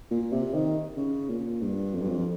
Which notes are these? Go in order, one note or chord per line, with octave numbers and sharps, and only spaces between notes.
A#2
C3
D#3
C#3
A#2
G2
F2
G2
F2